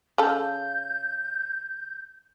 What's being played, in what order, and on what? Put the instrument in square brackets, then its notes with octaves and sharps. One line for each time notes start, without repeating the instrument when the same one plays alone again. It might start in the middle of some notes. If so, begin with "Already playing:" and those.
[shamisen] C#3 A4 [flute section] G6